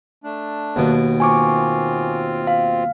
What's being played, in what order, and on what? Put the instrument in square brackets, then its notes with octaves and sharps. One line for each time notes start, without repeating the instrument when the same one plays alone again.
[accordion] A3 D4
[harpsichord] D#2 B2
[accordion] C4 F4 [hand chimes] G#5 C#6 D6
[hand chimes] F5